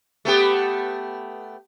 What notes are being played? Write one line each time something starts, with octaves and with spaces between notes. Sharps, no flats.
A3 B3 G4